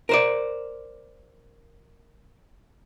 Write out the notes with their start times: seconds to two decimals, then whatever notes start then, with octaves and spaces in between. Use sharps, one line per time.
0.09 A#4 C5 D5